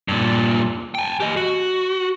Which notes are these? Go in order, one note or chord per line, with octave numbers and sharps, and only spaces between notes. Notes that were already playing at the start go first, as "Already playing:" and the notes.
G2 A#2
G5 G#5
G4 D#5
F#4